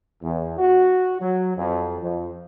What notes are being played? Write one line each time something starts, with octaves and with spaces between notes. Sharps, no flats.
E2
F#4
F#3
F2
F2